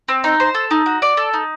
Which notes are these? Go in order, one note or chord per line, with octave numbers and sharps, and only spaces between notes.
C4
D#4
C5
A4
D#4
F#4
D5
A4
D#4